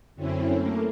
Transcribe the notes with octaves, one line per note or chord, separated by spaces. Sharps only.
F#2 D3 C4 C#4 E4
A3 A#3